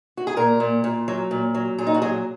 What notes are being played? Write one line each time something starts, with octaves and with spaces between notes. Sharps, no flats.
F#4
G#4
A#2 A#4
A#2
A#2
F#3
A#2
F#3
A#2 G#4
D#4
F#4
F#3 G#4